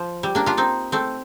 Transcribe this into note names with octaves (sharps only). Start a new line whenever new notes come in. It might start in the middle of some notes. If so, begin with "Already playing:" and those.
Already playing: F3
G3
A#3 D4
D4 F4
C4 D#4
A3 C4